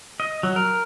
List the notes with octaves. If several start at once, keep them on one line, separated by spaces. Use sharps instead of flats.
D#5
F#3
A#4